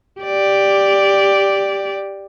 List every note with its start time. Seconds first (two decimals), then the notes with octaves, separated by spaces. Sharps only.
0.21 G4 D5